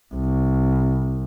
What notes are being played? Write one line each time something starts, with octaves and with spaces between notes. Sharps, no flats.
C2